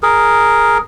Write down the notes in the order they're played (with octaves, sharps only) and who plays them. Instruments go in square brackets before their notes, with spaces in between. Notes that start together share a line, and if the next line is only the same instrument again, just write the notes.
[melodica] G#4 A#4